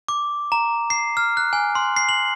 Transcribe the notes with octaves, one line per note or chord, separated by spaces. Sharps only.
D6
A#5
C7
F6
F#6
G#5
C6
C7
F#7